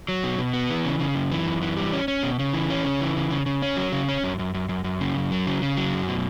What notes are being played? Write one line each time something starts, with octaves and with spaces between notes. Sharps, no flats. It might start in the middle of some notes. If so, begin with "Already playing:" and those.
F#3
B2
B2
B3
E3
C#3
C#3
F#2
E3
F#2
E3
G3
C#4
C#4
B2
C#3
E3
C#4
C#3
E3
C#3
C#3
C#3
C#4
F#3
C#3
C#4
F#2
F#2
F#2
F#2
F#2
C#3
F#2
F#3
C#3
C#3
F#3
F#2
B2